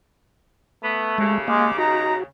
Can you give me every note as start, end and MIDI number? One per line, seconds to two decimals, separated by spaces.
0.83 1.40 57
0.83 1.16 59
1.18 2.23 39
1.18 2.23 49
1.18 1.38 56
1.48 1.68 56
1.48 1.72 58
1.48 1.72 77
1.48 1.78 86
1.78 2.13 63
1.78 2.24 66
1.78 2.16 82